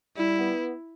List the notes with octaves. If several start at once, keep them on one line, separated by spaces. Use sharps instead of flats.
G3 E4
B3